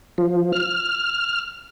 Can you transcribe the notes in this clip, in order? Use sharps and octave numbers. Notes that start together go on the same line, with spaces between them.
F3
F6